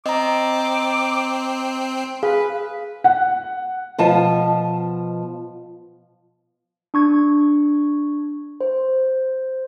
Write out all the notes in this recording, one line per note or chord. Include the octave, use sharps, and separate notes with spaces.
C4 D#5 A#5 D6
G#4 B4 F5
F#5
B2 F3 A5
D4 C#6 G#6
C5